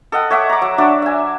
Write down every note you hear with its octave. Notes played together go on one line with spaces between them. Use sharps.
A4 D#5 F#5 G5
C#5 E5 F#5 D6
A#5 D6
F#3 E6
D4 F#4 D5 E5
E5 G#5